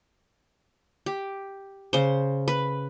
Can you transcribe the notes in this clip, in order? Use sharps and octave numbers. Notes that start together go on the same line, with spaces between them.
G4
C#3 C5
B4